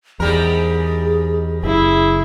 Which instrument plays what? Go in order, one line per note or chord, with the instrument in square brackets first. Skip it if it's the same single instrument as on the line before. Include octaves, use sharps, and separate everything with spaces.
[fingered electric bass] E2 [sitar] G#2 G3 A#4 [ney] G#4
[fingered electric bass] F#1 [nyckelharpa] E4 G#4